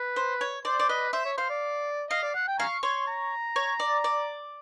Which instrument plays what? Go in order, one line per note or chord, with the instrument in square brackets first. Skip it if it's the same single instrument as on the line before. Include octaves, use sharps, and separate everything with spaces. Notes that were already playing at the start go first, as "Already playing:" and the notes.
Already playing: [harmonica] B4
[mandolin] C5
C#5
[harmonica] C5 [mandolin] D5
[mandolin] D5
[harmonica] B4 [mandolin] D#5
[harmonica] C5 [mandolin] E5
[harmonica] C#5
[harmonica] C5 [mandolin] F5
[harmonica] D5
[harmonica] D#5 [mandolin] F5
[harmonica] D5
F#5
G5
[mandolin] F5 [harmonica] G#5 A#5 C#6
[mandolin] C#5 [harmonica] C6
[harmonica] A#5
[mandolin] C#5
D5
D5